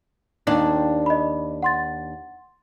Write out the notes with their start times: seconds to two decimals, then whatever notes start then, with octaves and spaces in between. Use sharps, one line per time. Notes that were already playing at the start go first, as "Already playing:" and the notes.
0.47 D#2 D4
1.06 D#5 B5
1.63 F#5 C6 A6